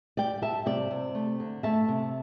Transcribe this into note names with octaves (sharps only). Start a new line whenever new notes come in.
G3 D5 G5
G3 E5 A5
C3 D5 G5
C3
A3
D3
A3 E5 A5
C3